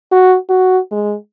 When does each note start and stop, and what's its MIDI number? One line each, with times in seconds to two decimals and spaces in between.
0.12 0.36 66
0.50 0.79 66
0.92 1.15 56